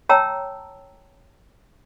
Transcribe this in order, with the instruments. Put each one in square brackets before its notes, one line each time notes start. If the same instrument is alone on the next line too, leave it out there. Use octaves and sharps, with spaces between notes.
[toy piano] C#5 G5 A5 A#5 E6